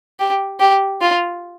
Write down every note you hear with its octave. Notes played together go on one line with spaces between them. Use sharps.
G4
G4
F4